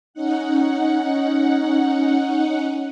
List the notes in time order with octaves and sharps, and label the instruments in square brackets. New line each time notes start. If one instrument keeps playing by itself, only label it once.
[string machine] C#4 D#4 F#5